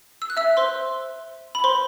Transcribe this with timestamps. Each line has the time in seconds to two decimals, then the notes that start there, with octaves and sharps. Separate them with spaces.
0.22 E6
0.30 F#6
0.37 E5 E6
0.57 C5 C6
1.55 B5
1.64 C5 C6